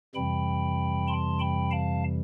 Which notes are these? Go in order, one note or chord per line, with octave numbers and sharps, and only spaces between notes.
F2 C3 E3 G3 G5 B5
A5 C6
G5 B5
F5 A5